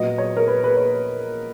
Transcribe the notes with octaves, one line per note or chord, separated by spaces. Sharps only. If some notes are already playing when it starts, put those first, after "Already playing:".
Already playing: A#2 F#3 B3 D#5
C#5
A#4
B4
B4
C#5